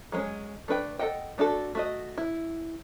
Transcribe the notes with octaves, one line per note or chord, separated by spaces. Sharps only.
F#3 G#3 C4 C#4
A3 D4 B4 G5
A4 B4 D#5 F#5 G5
A3 D4 F#4 A4
A3 F#4 D#5
E4